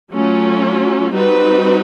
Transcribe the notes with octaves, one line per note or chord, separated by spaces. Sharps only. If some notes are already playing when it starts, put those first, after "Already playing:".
F#3 A3 C#4 F4
G3 C4 D#4 F#4 B4